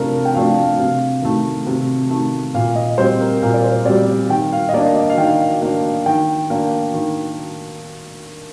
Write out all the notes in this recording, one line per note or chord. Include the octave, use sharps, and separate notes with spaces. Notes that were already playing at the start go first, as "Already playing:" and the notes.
Already playing: C3 F3 A3 D4 A4 A#4
G5
F3 A3 D4 F5
C3 F5
D#3 A3
C3
D#3 A3
A#2 F5
D#5
G3 C4 C5
A#4
A#2 A#4
D5
C5
G3 C4 D5
D#3 G5
F5
D#5
A#3 D4 D5
D#5
F5
D#3 G5
A#3 D4
D#3 G5
A#3 D4
D#3